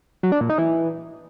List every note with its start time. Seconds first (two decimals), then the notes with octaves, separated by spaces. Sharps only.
0.23 F#3
0.32 D4
0.41 A#2
0.50 D#4
0.58 E3